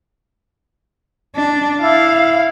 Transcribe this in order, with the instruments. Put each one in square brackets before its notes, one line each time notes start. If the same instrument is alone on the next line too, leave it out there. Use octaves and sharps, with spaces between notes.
[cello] D4
[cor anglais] E4 [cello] F5